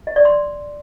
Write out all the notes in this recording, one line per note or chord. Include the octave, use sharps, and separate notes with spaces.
D#5
D5
C6